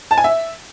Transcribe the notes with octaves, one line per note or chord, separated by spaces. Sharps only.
A5
G#5
E5